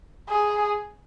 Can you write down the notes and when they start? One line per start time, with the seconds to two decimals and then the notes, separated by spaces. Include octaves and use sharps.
0.29 G#4